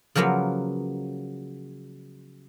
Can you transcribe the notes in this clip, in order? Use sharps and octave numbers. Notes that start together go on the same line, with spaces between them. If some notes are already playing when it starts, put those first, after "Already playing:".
C#3 F3 F#3 A#3 B3